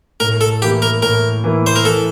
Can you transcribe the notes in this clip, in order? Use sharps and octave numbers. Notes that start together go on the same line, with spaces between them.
A2 A#4
A4
E3 A#3 E4 G4
A#4
A2 A#4
E3 A#3 E4
C5
A#4
E3 A4